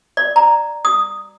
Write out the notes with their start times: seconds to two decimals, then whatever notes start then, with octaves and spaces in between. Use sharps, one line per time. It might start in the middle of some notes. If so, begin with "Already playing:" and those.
0.17 D5
0.36 A#5
0.85 D#6